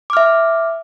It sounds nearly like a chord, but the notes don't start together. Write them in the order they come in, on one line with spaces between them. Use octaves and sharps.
D6 F6 E5